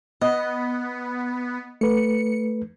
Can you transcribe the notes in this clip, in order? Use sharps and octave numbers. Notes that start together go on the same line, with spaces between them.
B3 D#5
A3 B4 C#7